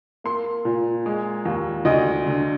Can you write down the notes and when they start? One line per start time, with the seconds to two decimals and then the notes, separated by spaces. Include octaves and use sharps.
0.24 A#3 C6
0.65 A#2
1.06 G#3
1.45 D#2
1.85 D2 D#5
2.26 D3